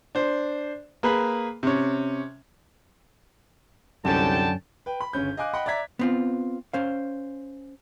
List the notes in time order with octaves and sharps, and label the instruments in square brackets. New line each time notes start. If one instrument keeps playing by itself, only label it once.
[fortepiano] D4 C5
A#3 G#4 B4 B5
C3 C#4
[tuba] C2 [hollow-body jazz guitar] F#2 C#4 [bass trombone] D3 [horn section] G5 A5
[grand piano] B4 G5
B5
G1 C#3 C#4 G6
D#5 F5 G#5 D6 F#6
D#5 F#5 G5 B5
D5 E5 A#5 G#6 B6
[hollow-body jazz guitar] B3 C4 F4
C#4 C5 F5